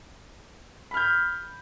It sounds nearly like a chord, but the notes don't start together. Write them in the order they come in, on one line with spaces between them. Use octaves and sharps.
B5 F6 G6